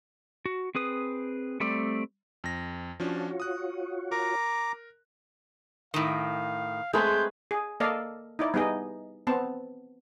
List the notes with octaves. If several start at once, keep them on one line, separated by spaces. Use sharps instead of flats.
F#4
C4 G#4 B4 D#6
G3 A3 C4 D5
F2 A#6
F3 C#4 D4 F4 F#4 C#5
D#6 F#6
A#4 A#5 D6
A2 D#3 F5
G#3 A3 C4 G#4 B4 G6
G#4
A#3 A4 D5 D#5 F5
D#4 E4 D5
G3 B3 D#4 G#4 D#5
B3 C4 A5